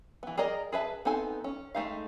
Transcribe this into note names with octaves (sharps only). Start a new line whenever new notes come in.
E3 B3
G#4 A#4 D5 D#5 A#5
G#4 B4 E5 A5
B3 C4 D#4 A4 G#5
C#4
G#3 A3 D#4 F5